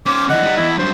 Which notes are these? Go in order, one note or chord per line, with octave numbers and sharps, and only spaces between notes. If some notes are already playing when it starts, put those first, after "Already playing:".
C#4 C5 D6
D3 E3 D#5 F#5
G3 D#4
E2 E4
G2 F#3 C5